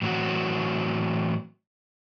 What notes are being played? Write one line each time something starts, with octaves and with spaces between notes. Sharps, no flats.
A2 E3 F#3 C4 F#4